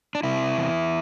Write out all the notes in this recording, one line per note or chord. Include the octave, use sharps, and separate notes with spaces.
D4
C3 E4
E2